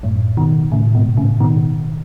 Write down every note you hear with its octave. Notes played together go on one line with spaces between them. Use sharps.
F#2 A2
B2 D#3
A2 C#3
G#2 B2
A2 C#3
B2 D#3